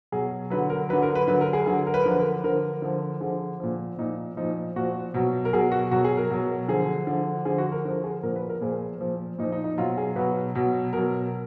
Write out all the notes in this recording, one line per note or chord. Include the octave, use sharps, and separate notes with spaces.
B2 F#3 G#4
D3 F#3 B4
A#4
D3 F#3 B4
A#4
B4
D3 F#3 B4
A#4
G#4
D3 F#3 G#4
A#4
B4
D3 F3 A#4
B4
A#4
D3 F3 A#4
D3 F3
D3 F3 G#4
A#2 F3
A#2 F3 D#4
A#2 F3 D#4
A#2 F3 F#4
B2 F#3
A#4
B2 F#3 G#4
F#4
B2 F#3 F#4
G#4
A#4
B2 F#3
D3 F3 G#4
D3 F3
D3 F3 G#4
F#4
A#4
D3 F3 A#4
G#4
A#2 F3 A#4
B4
A#4
A#2 F3 G#4
A#2 F3
A#2 F3 D#4
D#4
D#4
B2 F#3 F4
G#4
B2 F#3 B4
B2 F#3
B2 F#3 A#4